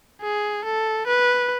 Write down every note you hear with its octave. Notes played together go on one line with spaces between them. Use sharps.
G#4
A4
B4